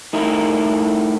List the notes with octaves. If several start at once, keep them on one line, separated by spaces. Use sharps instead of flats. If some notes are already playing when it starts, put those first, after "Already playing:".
A3 D#4 E4 A#4